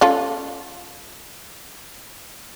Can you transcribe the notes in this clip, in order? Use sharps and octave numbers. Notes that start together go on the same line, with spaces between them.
C#4 F4 A4